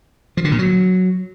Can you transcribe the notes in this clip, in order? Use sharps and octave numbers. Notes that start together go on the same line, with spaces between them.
F3
D3
A#2
F#3